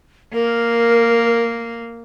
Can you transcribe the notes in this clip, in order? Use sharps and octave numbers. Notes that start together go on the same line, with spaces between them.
A#3 A#4